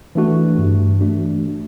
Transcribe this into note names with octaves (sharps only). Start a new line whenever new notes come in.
E3 A3 D4 F#4
G2
E3 A3 D4 F#4